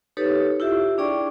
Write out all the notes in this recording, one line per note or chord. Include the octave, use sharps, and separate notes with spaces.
D#4 G4 A4 B4 C#5
E4 F4 G4 E5
D4 G#4 D5 G5 C#6